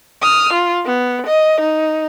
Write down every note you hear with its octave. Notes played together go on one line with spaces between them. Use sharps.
D#6 F6
F4
B3
D#5
D#4